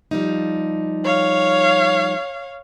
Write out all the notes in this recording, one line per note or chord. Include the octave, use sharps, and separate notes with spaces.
F3 G3 D#4
C#5 F5